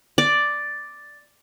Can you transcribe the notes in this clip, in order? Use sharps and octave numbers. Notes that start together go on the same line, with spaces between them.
D5